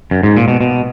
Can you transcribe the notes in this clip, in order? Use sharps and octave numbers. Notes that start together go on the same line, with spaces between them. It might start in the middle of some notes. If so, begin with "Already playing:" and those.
F#2
G#2
A#2
B2
B2